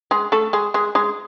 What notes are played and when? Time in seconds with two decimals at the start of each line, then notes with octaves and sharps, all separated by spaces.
0.11 G#3 G#4
0.32 A3 A4
0.53 G#3 G#4
0.74 G#3 G#4
0.95 G#3 G#4